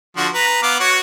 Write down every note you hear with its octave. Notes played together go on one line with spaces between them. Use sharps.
D3 F3 F#4
B4 A#5
B3 F5 D6
F#4 C#5 F#5